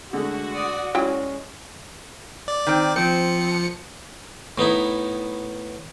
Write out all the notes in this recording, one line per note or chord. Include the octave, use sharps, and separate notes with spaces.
D3 G#3 A3 F#4
D5 D#6
E3 F#3 G#3 C#4 G5
D5
D#3 C4
F3 C4 C#7
A2 B3 D#4 E4